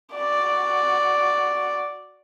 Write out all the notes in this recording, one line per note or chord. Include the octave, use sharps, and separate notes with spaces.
F#4 D5